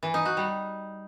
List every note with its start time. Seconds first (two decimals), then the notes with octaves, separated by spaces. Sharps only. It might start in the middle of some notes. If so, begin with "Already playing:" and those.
0.03 E3
0.14 D#4
0.25 F#4
0.37 G3